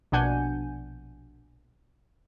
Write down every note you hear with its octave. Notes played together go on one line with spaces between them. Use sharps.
A#1 B2 D4 F#5 G#5 G6